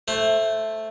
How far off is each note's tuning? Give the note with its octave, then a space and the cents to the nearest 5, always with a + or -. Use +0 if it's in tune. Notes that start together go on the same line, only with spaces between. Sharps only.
A3 +0 C5 +15